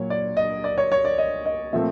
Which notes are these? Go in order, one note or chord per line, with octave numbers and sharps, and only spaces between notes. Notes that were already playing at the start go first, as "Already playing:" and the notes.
Already playing: A#2 F#3 C#5
D5
D#5
D5
C#5
C#5
D5
D#5
D#5
A#2 F3 A3 C4 E5